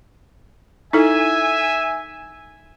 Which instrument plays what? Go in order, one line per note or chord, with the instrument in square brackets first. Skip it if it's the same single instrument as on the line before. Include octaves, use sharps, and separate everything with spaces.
[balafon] D#4 E4 A4 [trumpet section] E5 G#5